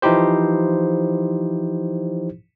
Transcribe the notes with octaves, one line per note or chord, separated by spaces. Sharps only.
E3 F3 D#4 E4 G4 C5